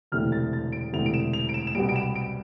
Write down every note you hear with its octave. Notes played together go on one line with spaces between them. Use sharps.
E1 D2 C3 E3 A3 F6
A6
A6
D7
E1 D2 C3 E3 A3 F7
D7
E7
F7
D7
E7
E7
C2 B2 G3 D7
D7
E7
D7